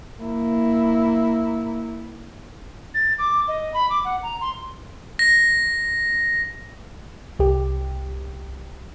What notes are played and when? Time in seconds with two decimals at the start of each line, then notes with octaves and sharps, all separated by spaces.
0.23 A#3 E4
2.94 A6
3.18 D6
3.48 D#5
3.74 B5
3.90 D6
4.04 F#5
4.23 A#5
4.41 C6
5.19 A#6
7.39 C2 G4